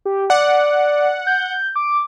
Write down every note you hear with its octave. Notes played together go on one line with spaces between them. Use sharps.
G4
D5 F#5
G6
D6